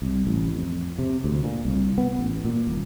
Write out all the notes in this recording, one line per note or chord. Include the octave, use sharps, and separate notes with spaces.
C2
A1
F2
C3
D2
A#2
C2
B3
A1
A#2
D#1